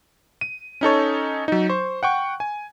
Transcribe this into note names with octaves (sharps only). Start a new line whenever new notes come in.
D#7
C#4 D#4 A4 C#5
F#3 D#4
C5 C#6
F#5 G5 C#6
G#5